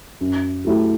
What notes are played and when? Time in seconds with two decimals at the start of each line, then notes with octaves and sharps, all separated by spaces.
0.21 F#2
0.65 F#3 A3 E4 G4